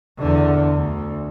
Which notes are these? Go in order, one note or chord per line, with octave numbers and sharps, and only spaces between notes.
E2 D3
D2